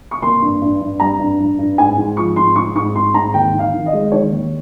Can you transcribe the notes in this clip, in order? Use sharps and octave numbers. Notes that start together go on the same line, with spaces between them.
C#6
A#3 C6
G2
G2
G2
G3 A#5
G2
G2
G2
G#2 G#5
G#2
F3 C#6
G#2 C6
G#2 C#6
G#2 C#6
G#2 C6
G#2 A#5
D#2 G5
D#3
F5
D#3
D#5
G#3
D#3 C#5
D#2